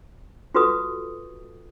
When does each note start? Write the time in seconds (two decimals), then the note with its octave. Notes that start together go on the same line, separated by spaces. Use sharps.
0.55 F4 F#4 A4 B4 C#6 D#6